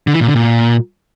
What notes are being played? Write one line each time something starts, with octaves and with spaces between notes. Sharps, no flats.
D3
E3
A#2
D3
A#2